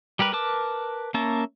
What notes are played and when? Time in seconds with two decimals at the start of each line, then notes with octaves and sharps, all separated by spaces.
0.19 G3 G4 A#4 B4
0.33 A#4 B4 A5 D6
1.14 A#3 C#4 A#4 E5 A5